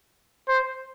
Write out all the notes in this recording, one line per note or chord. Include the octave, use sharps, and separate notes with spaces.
C5